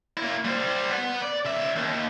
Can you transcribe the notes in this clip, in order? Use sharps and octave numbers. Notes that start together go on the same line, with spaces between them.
A#3 E4
G3 C5
B4 F#5
D5
C#2 E5
D#2